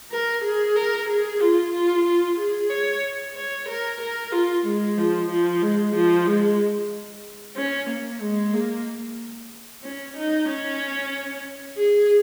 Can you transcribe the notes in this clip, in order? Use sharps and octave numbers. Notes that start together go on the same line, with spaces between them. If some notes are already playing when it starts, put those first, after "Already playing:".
A#4
G#4
A#4
G#4
F4
F4
F4
G#4
C#5
C#5
A#4
A#4
F4
G#3
F3
F3
G#3
F3
G#3
C#4
A#3
G#3
A#3
C#4
D#4
C#4
G#4